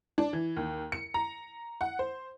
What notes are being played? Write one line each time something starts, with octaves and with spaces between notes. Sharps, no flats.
D4
E3
D#2
C#7
A#5
F#5
C5